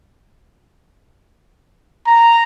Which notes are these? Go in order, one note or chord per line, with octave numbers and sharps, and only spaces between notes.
A#5